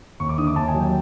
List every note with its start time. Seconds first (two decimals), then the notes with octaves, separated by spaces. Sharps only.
0.20 D#2 C#6
0.29 D6
0.38 D3 D#6
0.47 D6
0.56 D#2 A5
0.68 G#5
0.74 F#3
0.80 G5